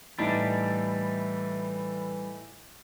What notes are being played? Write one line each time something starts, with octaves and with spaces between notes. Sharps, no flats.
A2 E3 G3 D4 D#4